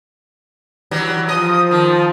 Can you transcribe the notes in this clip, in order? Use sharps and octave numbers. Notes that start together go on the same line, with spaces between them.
E3 F#3 G3
F3 D#5 D#6
D#3 A5